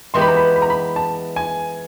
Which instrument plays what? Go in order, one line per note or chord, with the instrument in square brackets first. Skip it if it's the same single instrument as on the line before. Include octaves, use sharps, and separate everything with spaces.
[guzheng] E3 G#3 B3 E4 G4 [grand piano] C6
[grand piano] B5
A#5
B5
B5
A#5
B5
A5
G#5